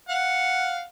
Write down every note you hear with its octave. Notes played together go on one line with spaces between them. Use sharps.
F5 F#5